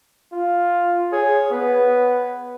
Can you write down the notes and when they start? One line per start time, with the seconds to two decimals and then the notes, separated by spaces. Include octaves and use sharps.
0.32 F4
1.12 G#4 C#5
1.52 B3 B4